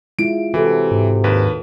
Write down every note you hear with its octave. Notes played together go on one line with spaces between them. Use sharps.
G#3 E4 F4 D7
C3 E3 F#4 A4
G#2
D#2 B4